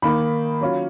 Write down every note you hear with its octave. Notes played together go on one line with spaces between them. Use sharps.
D#3 A#3 D#4 B5
F#3 C#4 F4